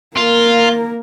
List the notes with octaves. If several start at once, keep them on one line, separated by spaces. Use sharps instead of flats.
A#3 F4 A#4